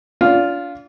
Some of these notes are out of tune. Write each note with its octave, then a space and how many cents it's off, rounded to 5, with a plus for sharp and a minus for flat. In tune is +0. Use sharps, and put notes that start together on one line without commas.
D4 -35 F4 +0